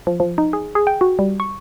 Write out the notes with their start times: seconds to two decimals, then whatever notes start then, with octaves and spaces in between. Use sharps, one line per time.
0.07 F3
0.20 F3
0.38 D#4
0.53 G#4
0.75 G#4
0.87 G5
1.01 F#4
1.19 G3
1.40 C#6